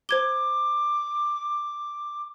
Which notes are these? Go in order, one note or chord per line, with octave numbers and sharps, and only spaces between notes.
C5 D6 G#6 G7